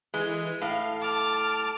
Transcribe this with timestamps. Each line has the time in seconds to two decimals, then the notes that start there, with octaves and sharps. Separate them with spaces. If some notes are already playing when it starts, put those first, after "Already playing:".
0.14 E3 G#3
0.61 A2 F5
1.02 A5 D6 F6